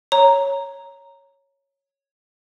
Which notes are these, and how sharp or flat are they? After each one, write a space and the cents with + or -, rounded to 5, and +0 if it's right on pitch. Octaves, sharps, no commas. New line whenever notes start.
C#5 -5 A#5 +0